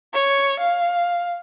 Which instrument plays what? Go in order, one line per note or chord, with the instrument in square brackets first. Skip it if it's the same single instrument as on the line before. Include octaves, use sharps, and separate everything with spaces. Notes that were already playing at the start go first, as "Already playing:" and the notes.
[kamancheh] C#5
F5